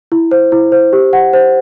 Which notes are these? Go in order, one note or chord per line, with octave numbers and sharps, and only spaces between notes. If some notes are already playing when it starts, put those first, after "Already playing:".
E4
C5
E4
C5
G4
F#5
C5